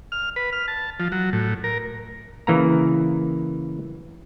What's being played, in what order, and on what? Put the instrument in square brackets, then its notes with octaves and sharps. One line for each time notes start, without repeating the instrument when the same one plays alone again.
[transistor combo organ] F6
B4
F6
A5
F3
F#3
A2
A#4
[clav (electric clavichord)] C#3 E3 A#3 A#5